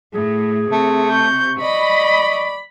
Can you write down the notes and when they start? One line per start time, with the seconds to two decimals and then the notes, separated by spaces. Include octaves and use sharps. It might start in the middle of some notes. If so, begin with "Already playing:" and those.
0.14 A2 G#4
0.72 C3 A3
1.12 C#6 G6
1.62 D5 D#5 B5